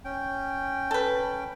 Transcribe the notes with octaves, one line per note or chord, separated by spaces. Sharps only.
C#4 G5
A4 B4